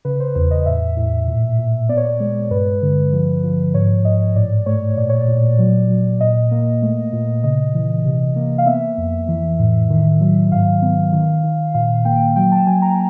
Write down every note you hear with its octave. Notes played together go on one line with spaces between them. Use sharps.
C#3 B4
C5
E2 C5
D#5
A2 E5
A2
A#2
A#2
B3 D5
C#5
D5
G#3
G2 B4
D3
F3
F3
G#2 C#5
G#2 D#5
A2 D5
A3 C#5
A#2 D5
C#5
D5
A#2
F#3
F#3
A#2 D#5
A#3
A3
A#2
C#3 D#5
E3
C3
A#3
F5
B3 E5
F2
E3
A2
D#3
F#3
G#2 F5
B3
D#3
D#3
A#2 F5
A#3 G5
F#3 G5
A5
F#3 G#5
A#5